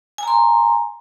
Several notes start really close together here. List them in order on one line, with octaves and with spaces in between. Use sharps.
G#5 A#5 C6